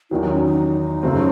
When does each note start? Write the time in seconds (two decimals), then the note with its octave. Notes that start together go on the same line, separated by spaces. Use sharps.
0.10 E2 D#3 F#3 E4
0.22 D#4
0.32 C#4
0.43 D#4
1.03 F#2 C#3 F#3 A3 C4